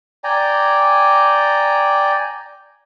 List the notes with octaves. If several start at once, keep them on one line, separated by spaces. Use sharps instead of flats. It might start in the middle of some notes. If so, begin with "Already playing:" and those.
D5 G5 G#5 A#5